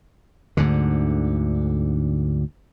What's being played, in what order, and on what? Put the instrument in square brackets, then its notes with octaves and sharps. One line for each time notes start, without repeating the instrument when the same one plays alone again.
[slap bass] D2 G#2 D3